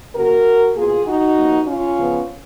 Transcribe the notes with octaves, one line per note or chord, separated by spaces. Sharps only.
C#3 F#3 A#3 F#4 A#4
B2 A#3 F4 G#4
D#4 F#4
F#2 F3 A#3
C#4 F4
C#3 F3 B3